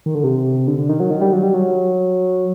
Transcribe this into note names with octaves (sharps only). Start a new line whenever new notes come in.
D#3
D3
C3
D3
D3
D#3
F#3
D#3
G3
F#3
G3
F#3